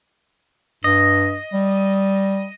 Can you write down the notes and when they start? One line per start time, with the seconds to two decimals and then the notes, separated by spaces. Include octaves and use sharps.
0.84 G2 D#5
1.54 G3